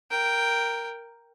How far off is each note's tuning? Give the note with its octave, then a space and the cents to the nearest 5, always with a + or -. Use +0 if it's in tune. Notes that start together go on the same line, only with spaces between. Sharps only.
A#4 +0 G5 +0